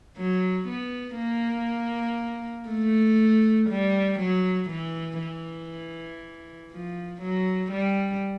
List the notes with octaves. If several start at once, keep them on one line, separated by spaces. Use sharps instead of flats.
F#3
B3
A#3
A3
G3
F#3
E3
E3
F3
F#3
G3